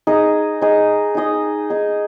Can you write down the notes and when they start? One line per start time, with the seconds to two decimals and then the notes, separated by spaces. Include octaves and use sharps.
0.07 D#4 G#4 D#5
0.62 D#4 G#4 D#5
1.15 D#4 G#4 D#5
1.70 D#4 G#4 D#5